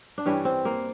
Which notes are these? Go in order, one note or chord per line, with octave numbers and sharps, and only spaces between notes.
D4
G2 E3 G3 C#4
C4
A#3